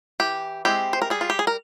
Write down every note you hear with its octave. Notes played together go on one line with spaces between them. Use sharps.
E3 G4
G#3 C4 E4 G4
C5
A#4
G3 G#4
F4
G4
G#4
A#4